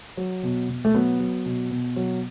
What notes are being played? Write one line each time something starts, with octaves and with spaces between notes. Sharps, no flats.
F#3
B2
B2
A3
F#3 B3
F#3
B2
B2
F#3